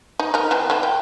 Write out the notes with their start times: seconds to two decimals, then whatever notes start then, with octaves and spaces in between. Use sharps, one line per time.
0.19 D#4
0.34 D#4 A#4
0.51 E3 B3 C4
0.70 D3 E4
0.83 G5